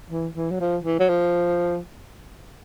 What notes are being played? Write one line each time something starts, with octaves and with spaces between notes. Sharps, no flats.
E3
E3
F#3
F3
E3
F#3
F3